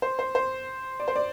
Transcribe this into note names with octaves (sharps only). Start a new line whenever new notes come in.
C5
C5
C5
D5
C5
D5